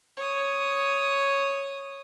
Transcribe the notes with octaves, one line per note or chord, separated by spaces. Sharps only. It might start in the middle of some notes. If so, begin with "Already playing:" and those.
C#5 D#6